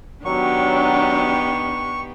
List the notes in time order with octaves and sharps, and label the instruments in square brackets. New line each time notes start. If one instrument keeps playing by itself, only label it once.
[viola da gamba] D#3 B3 G4 [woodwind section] F#3 [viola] D4 [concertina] C#6